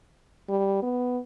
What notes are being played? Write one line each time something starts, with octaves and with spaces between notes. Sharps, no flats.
G3
B3